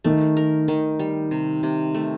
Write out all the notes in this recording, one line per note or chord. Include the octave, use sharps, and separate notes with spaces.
D#3 A3
A#4
D#3
G3
C3
C3
A3